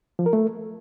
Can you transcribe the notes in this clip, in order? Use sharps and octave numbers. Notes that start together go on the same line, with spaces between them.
F3
A#4
A3